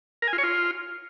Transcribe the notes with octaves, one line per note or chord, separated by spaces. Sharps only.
A#4
G#5
F4
C#5
F4